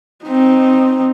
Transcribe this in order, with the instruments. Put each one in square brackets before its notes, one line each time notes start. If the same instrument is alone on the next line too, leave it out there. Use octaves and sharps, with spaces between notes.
[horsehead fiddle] C4 D#4